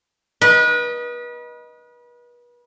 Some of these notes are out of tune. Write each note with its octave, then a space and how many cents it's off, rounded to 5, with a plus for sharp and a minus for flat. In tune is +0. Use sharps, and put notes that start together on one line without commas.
B4 -35 D#5 +0